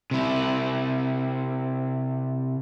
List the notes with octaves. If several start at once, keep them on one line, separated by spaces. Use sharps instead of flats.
C3 E4